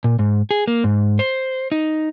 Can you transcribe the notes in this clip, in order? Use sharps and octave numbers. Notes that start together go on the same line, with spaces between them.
A#2
G#2
G#4
A#3
G#2
C5
D#4